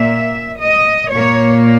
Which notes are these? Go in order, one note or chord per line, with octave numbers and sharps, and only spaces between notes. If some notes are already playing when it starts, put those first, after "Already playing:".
Already playing: A#2 A#3 E5
D#5
A#2 A#3 C#5